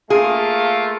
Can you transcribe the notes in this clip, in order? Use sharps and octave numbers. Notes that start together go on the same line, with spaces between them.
A3 A#3 F4 G#4